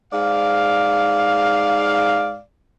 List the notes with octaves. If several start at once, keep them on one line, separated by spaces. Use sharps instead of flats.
G#2 D5 F5